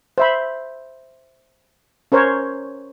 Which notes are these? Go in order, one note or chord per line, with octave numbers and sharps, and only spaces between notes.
C5 E5 B5
C#4 A#4 C5 C#5